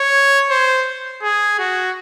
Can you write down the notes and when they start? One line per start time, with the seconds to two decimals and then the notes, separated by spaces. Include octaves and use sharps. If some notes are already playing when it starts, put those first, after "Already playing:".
Already playing: C#5
0.50 C5
1.23 G#4
1.59 F#4